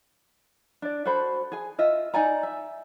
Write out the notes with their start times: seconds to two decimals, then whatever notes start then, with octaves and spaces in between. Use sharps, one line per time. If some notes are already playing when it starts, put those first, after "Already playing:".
0.82 D4 D5
1.05 F#4 A4 C5 B5
1.52 G#4 G#5
1.78 F4 D#5 E5
2.14 D#4 D5 G#5 A#5
2.43 E5